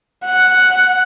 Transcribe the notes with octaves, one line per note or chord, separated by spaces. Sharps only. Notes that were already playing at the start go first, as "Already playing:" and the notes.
F#5